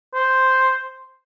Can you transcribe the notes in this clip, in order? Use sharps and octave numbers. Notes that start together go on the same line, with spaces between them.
C5